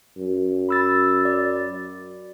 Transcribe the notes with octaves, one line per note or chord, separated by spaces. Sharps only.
F#2
B5 E6 A6
D5